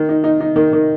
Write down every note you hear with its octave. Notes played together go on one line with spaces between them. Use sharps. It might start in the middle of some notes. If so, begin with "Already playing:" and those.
Already playing: D#3
D#4
D#4
D#4
D#3
D#3